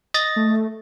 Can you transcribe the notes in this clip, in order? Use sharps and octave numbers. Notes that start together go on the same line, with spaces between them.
D#5 A6 A#6
A3